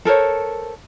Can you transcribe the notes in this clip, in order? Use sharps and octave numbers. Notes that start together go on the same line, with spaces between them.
A4 A#4 C5 C#5